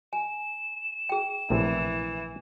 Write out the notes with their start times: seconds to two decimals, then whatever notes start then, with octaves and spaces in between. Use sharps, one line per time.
0.13 G#5 E7
1.09 G#4 G5
1.50 A#1 A2 C3 E3